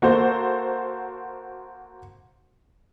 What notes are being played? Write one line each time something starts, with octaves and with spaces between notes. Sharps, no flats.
A#3 F#4 A4 C5